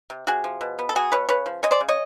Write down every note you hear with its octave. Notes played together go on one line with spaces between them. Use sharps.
C3
C3 F#4 G#4
F3
B2
B3
A4
F#3 F#4 G#4
B2 B4 C#5
C#3 B4 C#5
F3
G#3 C#5 D#5
C5 D5
C#3
C#5 D#5